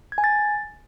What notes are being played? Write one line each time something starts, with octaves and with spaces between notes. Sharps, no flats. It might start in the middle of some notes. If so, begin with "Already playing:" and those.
G#6
G#5
A6